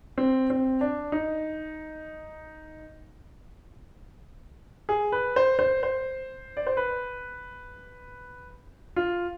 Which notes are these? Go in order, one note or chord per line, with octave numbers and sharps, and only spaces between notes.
C4
C4
D4
D#4
G#4
B4
C5
C5
C5
D5
C5
B4
F4